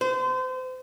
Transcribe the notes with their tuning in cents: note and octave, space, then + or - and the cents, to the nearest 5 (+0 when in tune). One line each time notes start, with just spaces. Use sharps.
C5 -35